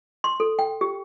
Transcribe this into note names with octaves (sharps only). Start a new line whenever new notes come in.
C6
A4
G5
G4